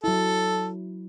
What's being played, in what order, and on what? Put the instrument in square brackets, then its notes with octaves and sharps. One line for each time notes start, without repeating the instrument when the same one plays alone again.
[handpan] F#3 E4 [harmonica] A4